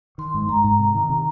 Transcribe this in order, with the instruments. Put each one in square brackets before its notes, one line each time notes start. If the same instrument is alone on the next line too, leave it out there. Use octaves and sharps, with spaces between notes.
[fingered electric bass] D#3 [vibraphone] C6
[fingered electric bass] G#2
[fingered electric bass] G#2 [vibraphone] A#5
[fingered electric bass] G#2
C3
D#3
C3